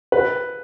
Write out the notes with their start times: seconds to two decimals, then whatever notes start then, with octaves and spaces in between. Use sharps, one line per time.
0.12 B4